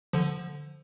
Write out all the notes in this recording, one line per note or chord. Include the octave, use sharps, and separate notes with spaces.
D3 F3